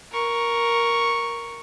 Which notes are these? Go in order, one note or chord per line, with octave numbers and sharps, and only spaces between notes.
A#4 C#6